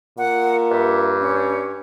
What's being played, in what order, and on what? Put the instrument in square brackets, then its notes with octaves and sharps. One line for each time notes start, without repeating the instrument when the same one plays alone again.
[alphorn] A#2 [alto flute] F#5
[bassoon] G2 [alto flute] E5
[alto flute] C#4